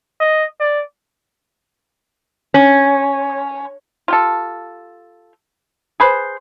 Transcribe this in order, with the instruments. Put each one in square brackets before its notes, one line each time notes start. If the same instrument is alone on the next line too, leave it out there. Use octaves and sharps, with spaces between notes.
[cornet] D#5
D5
[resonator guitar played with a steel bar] C#4
[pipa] F4 G4 A4
G#4 B4 C5